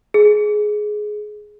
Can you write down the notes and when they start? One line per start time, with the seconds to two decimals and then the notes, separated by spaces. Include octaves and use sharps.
0.14 G#4